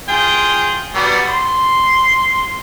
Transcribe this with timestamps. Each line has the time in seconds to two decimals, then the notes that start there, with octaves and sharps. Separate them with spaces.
0.09 F4 G#4 G5
0.95 F#3 G3 B3
1.26 C6